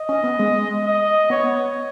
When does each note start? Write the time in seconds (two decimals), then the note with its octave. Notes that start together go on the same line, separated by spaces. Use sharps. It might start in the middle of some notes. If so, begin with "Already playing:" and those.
Already playing: D#5
0.09 C#4
0.24 B3
0.39 G#3
0.85 D#5
1.30 B3 C#5